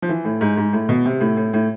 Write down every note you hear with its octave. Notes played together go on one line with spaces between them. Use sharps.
F3
E3
A2
G#2
G#2
A2
B2
C3
A2
A2
A2